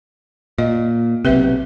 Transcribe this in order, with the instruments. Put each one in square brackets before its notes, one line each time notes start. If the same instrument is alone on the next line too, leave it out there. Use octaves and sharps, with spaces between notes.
[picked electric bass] A#2 [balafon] D#5
[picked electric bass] B1 C3 [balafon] C4 B4 E5